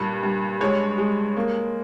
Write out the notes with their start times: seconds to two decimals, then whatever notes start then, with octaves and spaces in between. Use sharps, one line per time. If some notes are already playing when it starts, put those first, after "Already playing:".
Already playing: G2 A#2 A#3
0.23 G2
0.60 G#3 C#5
0.98 G#3
1.37 A#3